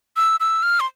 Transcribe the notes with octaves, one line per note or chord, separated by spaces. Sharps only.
E6
E6
F6
C6